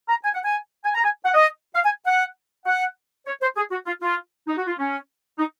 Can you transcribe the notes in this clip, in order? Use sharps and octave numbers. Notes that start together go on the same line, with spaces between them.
A#5
G#5
F#5
G#5
G#5
A#5
G#5
F#5
D#5
F5
G#5
F#5
F#5
C#5
C5
G#4
F#4
F4
F4
D#4
F#4
F4
C#4
D#4